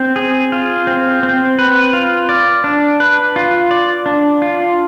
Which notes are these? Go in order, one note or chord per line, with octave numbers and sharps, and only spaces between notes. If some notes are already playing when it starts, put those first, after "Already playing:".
Already playing: C4
G#4
F4
C4
C4
B4
F4
D5
D4
B4
F4
D5
D4
F4